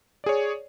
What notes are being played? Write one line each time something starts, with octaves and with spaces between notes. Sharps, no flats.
G#4 C#5 D5